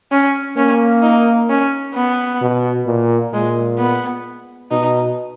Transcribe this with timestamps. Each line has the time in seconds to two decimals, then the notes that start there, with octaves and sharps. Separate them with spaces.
0.12 C#4
0.57 A#3 C#4
1.02 D#4
1.49 C#4
1.95 B3
2.41 B2
2.86 A#2
3.33 A#2 G#3
3.78 B3
4.71 B2 D#4